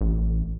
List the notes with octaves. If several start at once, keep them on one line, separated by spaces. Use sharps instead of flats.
A1